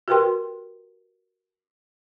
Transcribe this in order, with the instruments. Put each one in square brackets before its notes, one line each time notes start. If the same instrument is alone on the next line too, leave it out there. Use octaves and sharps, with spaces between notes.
[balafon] F#4 G4 A#4 B4 G5 C6